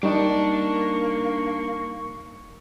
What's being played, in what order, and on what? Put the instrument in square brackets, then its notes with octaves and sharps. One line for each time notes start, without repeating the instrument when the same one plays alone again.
[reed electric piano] G3 D#4 D5 [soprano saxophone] A#3 [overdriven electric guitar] D4 A5 [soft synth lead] C#6